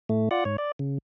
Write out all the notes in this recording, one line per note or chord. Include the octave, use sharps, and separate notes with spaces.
A2 A3
F4 D5 F#5
G#2 C#5
D5
C#3